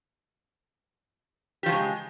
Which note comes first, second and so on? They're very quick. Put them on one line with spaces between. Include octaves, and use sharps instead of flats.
G4 F3 C#3 G#3